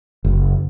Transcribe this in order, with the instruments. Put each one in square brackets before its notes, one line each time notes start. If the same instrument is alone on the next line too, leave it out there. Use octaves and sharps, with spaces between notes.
[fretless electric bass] F#1